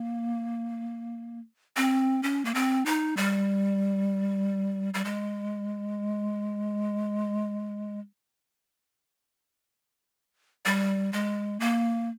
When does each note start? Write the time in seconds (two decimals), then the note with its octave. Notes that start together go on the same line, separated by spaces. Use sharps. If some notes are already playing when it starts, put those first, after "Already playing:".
Already playing: A#3
1.76 C4
2.23 C#4
2.45 A#3
2.54 C4
2.86 D#4
3.17 G3
4.94 G3
5.05 G#3
10.65 G3
11.13 G#3
11.60 A#3